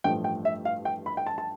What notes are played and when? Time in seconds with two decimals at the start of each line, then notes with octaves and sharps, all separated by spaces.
0.04 A1 G2 F3 A3 G5
0.24 G5
0.45 E5
0.65 F5
0.85 G5
1.06 B5
1.17 G5
1.26 A5
1.38 A5